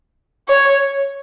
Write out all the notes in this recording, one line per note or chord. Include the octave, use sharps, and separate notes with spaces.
C#5